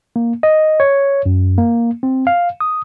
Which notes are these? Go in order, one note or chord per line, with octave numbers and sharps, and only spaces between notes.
A#3
D#5
C#5
F#2
A#3
C4
F5
D#6